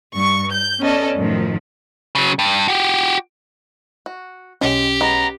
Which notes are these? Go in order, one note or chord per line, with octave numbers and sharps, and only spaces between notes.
G2 C#6
G6
B3 C#4 A4 D5 D#5
F#2 A2 D#3 F3
C#3 F#3
G2
F#4 G4
F#4
B1 G#3 C#4 G4
G#3 B3 G#4 A#5